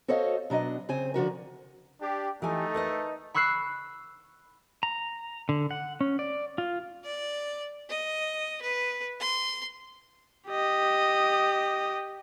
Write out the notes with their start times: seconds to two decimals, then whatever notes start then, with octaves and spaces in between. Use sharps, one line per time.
0.08 F#4 A4 C5 C#5 D#5 F5
0.50 B2 F#3 D4 D#5
0.89 C#3 C4 C5 G#5
1.14 D3 F3 F#4 A#4
2.01 D4 G4
2.42 E3 A3 D#4 G4 A4 G#5
2.74 A#4 B4 D#5
3.34 B5 C#6 E6 F#6 C7
4.83 A#5
5.49 D3
5.71 F#5
6.01 C#4
6.19 D5
6.58 F4
7.04 D5
7.90 D#5
8.62 B4
9.20 C6
10.49 G4 D#5